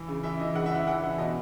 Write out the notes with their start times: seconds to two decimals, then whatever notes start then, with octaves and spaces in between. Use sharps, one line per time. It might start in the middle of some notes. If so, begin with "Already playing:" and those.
Already playing: E3
0.08 C#3
0.23 E3 E5
0.39 E3 D#5
0.55 C#3 F#5
0.66 E5
0.71 E3 F#5
0.87 E3 F#5
1.03 E3
1.18 B2 D#5